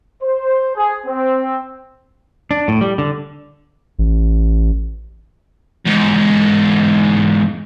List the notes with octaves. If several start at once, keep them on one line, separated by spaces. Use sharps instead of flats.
C5
G#4
C4
D4
A2
G3
D3
A1
E2 G#2